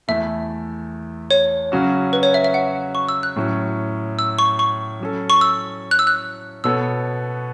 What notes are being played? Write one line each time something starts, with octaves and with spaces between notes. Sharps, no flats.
E2 E3 A3 E4 A4 E5
C#5
C#3 F#3 C#4 F#4
B4
C#5
E5
E5
F#5
C#6
E6
F#6
A2 F#3 C#4
E6
C#6
C#6
F#3 C#4 A4
C#6
E6
F#6
E6
F#6
B2 B3 A4 C#5 E6